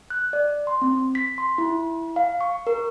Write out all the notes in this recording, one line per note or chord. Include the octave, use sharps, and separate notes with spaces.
F#6
D5
C6
C4
B6
C6
E4
F5
C#6
A#4